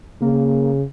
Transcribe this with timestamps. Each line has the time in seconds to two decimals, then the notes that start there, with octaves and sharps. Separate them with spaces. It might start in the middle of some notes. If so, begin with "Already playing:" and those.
0.21 C#3 A#3